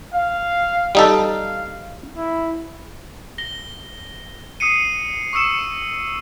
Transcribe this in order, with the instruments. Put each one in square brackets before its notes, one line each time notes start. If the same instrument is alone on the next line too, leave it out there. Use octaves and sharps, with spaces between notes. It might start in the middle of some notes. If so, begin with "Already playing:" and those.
[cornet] F5
[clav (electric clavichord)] G3 D#4 A4 [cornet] F5
[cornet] E4
[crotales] A#6 G7
D#6 C7 C#7 D#7
C#6 D#6 E6 C#7 E7